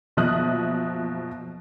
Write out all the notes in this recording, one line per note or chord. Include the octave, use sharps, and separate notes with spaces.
F#1 B2 F3 E5 D#6 F#6